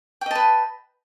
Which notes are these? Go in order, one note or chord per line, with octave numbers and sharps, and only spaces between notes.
B4 D#5 G5 A5